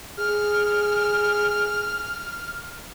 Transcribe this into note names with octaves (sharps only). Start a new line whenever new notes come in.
G#4 F6